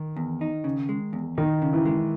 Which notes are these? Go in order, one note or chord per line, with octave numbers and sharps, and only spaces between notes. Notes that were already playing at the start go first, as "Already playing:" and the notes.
Already playing: D#3
E2
D#4
C#3
G#3
E2
D#3 D#4
C#3
E3
G#3